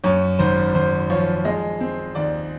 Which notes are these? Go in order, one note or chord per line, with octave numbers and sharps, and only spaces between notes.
F#2 C#5
G#1 C5
G#1 C5
F3 C#5
G#3 D#5
C4
D#2 D5